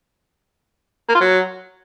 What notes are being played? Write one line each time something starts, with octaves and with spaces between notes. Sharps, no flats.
A#3
F4
F#3